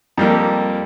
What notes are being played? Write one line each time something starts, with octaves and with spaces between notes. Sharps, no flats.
F2 G3 A#3